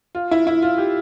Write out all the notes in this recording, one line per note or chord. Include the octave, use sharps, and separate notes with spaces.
F4
E4
E4
F4
G4